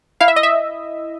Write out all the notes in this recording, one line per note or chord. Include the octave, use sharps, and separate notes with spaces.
E4 F5
E5
D#5
E5